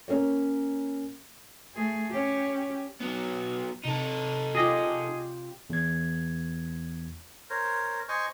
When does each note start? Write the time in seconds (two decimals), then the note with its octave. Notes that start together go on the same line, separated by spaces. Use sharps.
0.08 A#3 C#4 A#4 C#5
1.75 A3 G#4
2.10 C#4 G4
3.01 F#3 B3
3.85 C3 D#4 A4
4.55 F4 G4 G#4 D#5
5.70 E2 G#6
7.50 A#4 C5 C#5
8.09 C5 D#5 G#5 C#6